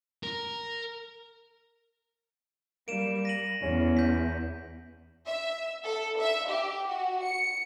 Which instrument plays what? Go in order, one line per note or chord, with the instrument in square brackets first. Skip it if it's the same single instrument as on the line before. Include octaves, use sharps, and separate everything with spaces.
[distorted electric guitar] A#4
[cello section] G3 [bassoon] A#3 [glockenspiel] D7 E7
[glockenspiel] A#6 D#7 F#7
[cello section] E2 [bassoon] C#4
[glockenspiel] G6 B6
[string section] E5
A4
E5
G4
F#4
C#7